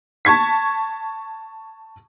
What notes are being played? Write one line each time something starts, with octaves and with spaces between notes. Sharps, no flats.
A5 C#6 G#6 B6